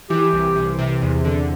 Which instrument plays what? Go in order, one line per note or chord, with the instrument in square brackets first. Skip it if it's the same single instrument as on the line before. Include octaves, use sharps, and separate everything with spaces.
[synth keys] E3 [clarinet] G4
[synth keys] C2
C3
C3
E2
D3